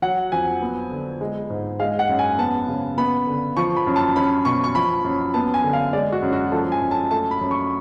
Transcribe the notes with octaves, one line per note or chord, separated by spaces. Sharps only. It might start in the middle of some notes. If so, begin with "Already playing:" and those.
F#3 F#5
F2 G#5
B3
D3
G#3
G#2
G#3 F5
F#5
F#2
G#5
B3 A5
C#3
B3 B5
D3
F3 C#6
B5
F#2
A5
C#4 B5
B2 C#6
C#6
F3 B5
F#2
B3 A5
G#5
D3
F5
G#3 D5
F#4
F#2
F#4
F3 A4
G#5
F#2
A5
A3 A5
B5
F#2
C#6